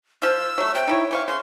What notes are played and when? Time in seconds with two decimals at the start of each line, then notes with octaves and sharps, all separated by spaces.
0.22 F3 F4 E6
0.58 F#3 A3
0.75 C3 G5
0.87 D#4 E4 C#5
1.11 E3 C5 F5 C#6
1.28 C#3 C6